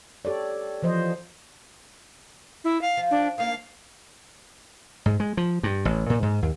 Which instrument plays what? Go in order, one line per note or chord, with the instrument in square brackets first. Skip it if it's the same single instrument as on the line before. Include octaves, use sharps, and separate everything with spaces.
[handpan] G4 A4 C#5 D5
E3 F3 C5 D#5
[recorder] E4
F5
[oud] F3
[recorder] D4
[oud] A#3 D4 D#4 [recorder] F5
[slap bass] G#2
G#3
F3
G2
A1
A#2
G#2
D#2